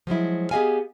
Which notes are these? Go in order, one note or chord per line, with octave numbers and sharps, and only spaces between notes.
F3 F#3 G#3 E4
B3 G4 G#4 D#5 F5 G#5